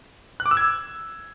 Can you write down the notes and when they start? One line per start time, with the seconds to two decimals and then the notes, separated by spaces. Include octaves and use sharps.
0.40 F#6
0.46 D6
0.51 E6
0.57 G#6